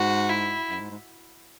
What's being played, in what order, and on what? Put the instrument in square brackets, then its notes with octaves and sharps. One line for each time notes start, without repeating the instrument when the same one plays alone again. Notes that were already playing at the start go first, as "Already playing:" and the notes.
Already playing: [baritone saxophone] G#2 [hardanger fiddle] F#4
[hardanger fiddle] E4
[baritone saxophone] F#2
G#2
G#2